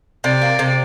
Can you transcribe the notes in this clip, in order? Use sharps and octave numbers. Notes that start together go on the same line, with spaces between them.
C3 D5
A#3
C3